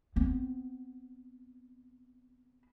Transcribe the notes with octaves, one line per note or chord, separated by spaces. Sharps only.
B3 C4